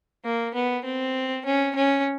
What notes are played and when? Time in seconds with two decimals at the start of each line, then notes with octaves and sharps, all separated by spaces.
0.25 A#3
0.55 B3
0.85 C4
1.45 C#4
1.76 C#4